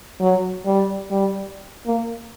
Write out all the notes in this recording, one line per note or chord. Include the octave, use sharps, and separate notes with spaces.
F#3
G3
G3
A#3